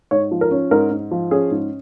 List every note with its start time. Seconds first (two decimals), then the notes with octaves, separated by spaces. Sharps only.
0.11 G#2 C#5
0.31 F3
0.41 A#4
0.51 C#4
0.71 G#2 A#4
0.91 G#2
1.11 F3
1.31 C#4 G#4
1.51 G#2